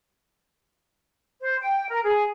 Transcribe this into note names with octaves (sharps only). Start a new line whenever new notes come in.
C5
G5
A#4
G#4